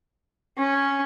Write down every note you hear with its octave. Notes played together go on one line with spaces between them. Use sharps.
C#4